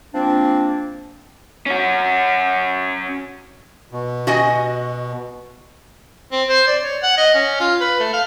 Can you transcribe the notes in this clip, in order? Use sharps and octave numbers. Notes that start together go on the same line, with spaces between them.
F3 A#3 C4 D4
C#4 F#4
B2
F#4 D#5 G#5
C4
C5
D5
C#5
F#5
D#5
C#4
F4
B4
A3
F5